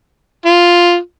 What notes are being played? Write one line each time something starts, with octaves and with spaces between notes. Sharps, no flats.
F4